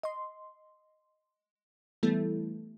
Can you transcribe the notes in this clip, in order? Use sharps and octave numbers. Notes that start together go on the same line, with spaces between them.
D#5 C6
E3 G3 A3 B3 E4 A4